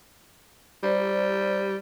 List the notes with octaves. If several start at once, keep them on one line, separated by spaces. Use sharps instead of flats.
G3 G4 C5 D5